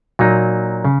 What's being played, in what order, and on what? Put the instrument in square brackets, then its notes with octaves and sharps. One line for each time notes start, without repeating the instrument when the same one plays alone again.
[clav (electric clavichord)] A#2 F#3 A#3 D#4
C#3